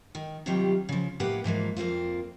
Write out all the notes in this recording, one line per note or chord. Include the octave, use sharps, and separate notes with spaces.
D#3
C3 D#3 F#3 G3 F4 G4
C#3 F3
A2 F3 A#3 G4 B4 F#5
G#2 E3 F3 A#3
F2 A#3 C4 F4